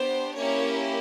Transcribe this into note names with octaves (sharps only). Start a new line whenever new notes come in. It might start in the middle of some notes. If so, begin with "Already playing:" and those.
Already playing: B3 D4 G4 C5
A#3 C#4 E4 G4 C#5